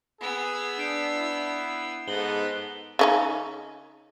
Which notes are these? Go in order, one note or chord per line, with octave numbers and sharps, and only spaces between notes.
B3 G#4 E6
D4 G6 C7 D7
E4
G#2 B3 D#4 A4 F#7 G7
C#3 C#4 D#4